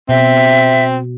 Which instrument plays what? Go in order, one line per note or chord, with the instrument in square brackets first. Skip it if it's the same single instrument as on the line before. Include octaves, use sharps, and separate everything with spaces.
[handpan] B2 [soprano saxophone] C4 [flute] E5